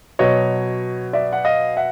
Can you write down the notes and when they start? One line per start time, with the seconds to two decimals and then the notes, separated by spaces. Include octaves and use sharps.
0.19 B2 F#3 C#5 D#5
1.13 D5 E5
1.33 F#5
1.45 D#5 F5
1.77 E5 F#5